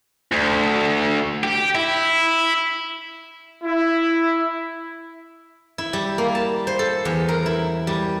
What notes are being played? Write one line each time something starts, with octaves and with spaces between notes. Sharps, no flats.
D2
G4
E4
E4
E4
G3
A#3
A5
C5
A4
E2
A#4
E4
G3